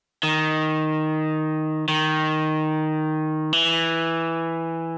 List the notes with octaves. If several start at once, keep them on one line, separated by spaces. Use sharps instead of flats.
D#3
D#3
E3